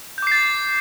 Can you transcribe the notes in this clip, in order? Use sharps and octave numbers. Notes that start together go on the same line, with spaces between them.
D6 G6 A6 C7